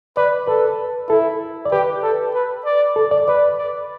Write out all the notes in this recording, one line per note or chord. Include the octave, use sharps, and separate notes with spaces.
B4 D5
A4 B4
E4 A4
D5
G4 B4
A4
B4
D5
A4
D5
B4 D5
D5